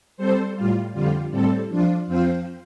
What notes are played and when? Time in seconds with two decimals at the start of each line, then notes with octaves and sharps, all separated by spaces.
0.17 G3 C4 A4 C5
0.55 A2 G3 F4
0.93 F2 D3 G3 F4
1.31 A2 G3 C4 A4
1.70 F3 D4 F4
2.07 F2 F3 C4 F4 C5